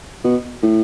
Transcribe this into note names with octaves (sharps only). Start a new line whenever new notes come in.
B2
A2